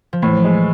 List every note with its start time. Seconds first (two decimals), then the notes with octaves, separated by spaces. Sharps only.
0.13 F3
0.22 A2 E3
0.44 G#3